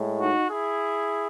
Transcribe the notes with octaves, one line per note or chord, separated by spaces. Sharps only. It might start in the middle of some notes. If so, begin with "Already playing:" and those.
Already playing: A2 G#3
D#4 F#4
E4 G#4